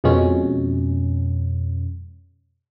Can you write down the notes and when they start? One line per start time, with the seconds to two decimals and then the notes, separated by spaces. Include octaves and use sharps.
0.04 F2 B2 G#3 C#4